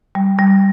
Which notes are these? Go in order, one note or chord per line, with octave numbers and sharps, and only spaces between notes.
G3
G3